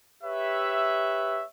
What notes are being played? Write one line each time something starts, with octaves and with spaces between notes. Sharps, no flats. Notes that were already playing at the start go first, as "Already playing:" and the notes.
G4 B4 C#5 E5